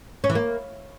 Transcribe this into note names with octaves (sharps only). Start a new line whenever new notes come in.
C#4
E3
A#3